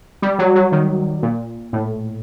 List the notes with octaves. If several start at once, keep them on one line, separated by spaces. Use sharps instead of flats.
G3
F#3
F#3
D#3
A#2
A2